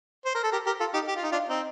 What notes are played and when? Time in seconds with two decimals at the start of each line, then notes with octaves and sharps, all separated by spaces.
0.25 C5
0.35 A#4
0.43 A4
0.52 G4 A#4
0.66 G4 A#4
0.80 F4 A4
0.94 D#4 G4
1.08 G4
1.16 F4
1.23 D#4
1.32 D4 F4
1.49 C4 D#4